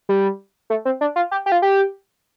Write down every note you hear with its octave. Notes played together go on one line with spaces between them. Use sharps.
G3
A3
C4
D4
F4
G4
G4
F4
G4